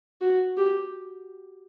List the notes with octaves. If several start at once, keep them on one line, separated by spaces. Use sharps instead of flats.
F#4
G4